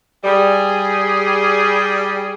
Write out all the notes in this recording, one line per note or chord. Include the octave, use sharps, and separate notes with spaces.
G3 G#4